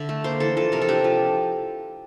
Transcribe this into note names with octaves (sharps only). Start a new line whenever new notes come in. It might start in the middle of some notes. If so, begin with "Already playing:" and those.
Already playing: D3 D5 E5
A3
A#3 C5
E3 A4
F3 A4
C3 A#4
A4
D4 G4
F3